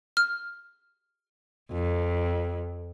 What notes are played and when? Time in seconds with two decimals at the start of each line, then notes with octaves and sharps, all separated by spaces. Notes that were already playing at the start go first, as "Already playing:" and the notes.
0.17 F6
1.72 F2